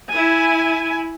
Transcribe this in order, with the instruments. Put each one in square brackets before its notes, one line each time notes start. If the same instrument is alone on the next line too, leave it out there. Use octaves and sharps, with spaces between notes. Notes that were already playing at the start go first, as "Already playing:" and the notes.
[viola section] E4 G#5